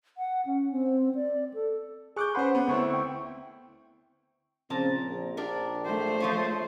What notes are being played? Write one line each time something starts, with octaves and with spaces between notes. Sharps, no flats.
F#5
C#4
C4
D5
A4
G#4 C#6 D6 F#6 G6
C#4 B4 C5 F#5 C6
B3
D2 B3 C4 E4 C#6
G5 C#6
A#2 C#3 F3 C4 A#4 A5
A#1
D4 G4 A#4
A3 C5
F3 F4 C#5